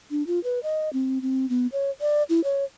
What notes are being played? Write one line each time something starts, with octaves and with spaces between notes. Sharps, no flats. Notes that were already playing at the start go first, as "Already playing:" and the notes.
D4
F4
B4
D#5
C4
C4
B3
C#5
D5
E4
C#5